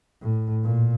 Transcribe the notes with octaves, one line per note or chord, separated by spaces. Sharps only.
A2
A#2